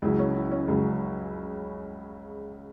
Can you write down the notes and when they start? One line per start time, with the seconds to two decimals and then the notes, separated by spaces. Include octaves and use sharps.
0.02 C#2 C#3 F#3 E4
0.19 C#4
0.35 E4
0.51 C#4
0.68 C#2 C#3 F#3